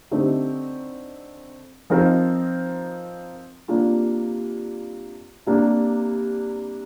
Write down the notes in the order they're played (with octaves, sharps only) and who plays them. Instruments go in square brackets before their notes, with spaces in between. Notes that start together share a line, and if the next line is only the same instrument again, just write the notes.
[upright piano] D3 A3 C4 D#4 G4
F3 C4 D#4 A#4
C3 G3 A#3 D4 F4
C3 G3 A#3 D4